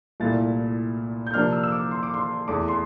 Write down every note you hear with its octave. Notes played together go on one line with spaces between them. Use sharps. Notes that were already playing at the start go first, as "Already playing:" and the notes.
C2 A#2 A3 E4 A6
G6
C3 F3 A#3 D4 F6
E6
E6
D6
C6
D6
C6
E2 E3 A3 E4 D6
C6